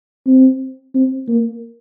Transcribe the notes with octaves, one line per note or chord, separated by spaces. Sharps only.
C4
C4
A#3